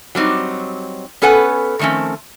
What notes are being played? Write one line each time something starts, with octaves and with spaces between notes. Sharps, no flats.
F#3 G3 C4 D#4
B3 C#4 A4 B4 F#5 G#5
D#3 F3 A3 C4 C#4